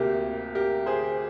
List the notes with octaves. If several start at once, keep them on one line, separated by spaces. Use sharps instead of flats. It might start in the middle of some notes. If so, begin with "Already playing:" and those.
Already playing: D2 C3 A#3 G4 A#4
G4 A#4
G#4 C5